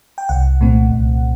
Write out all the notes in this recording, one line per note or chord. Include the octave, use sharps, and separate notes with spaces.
G5
C2 F#5
A#2 A3 C4
C2